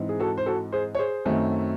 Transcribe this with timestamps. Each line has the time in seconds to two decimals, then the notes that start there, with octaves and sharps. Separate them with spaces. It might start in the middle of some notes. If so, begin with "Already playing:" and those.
Already playing: G#2 E3 C4
0.09 G#4
0.19 F#4 A4
0.38 C5
0.46 F#4 A4
0.72 G#4 C5
0.95 C#5
0.99 G#4 C5
1.25 F#2 D#3 F#3 A3 C4